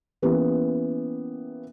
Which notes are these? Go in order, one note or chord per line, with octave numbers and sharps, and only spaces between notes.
E3 A#3 B3 C#4 G4